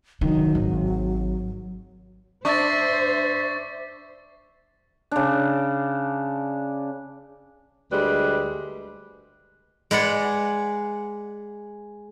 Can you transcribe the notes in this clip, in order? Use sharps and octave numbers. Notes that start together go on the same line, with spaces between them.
D#3 F#3
G#1
D4 C5 E5 C#6 A6
C#3 D4
D2 G3 G#3 B4
G#3 B4 D5 F#5